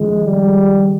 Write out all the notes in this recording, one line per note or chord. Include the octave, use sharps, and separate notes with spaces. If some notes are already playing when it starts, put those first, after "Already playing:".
Already playing: D#2 C#3 F3 G#3
G3